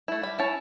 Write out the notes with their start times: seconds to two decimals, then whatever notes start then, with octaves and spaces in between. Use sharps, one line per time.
0.08 A3 E4
0.23 G3 B5
0.39 C#4 E4 A5